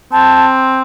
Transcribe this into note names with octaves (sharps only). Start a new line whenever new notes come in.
C4 A5